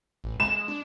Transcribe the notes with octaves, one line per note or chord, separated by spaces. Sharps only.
A1
G#3 E7
D4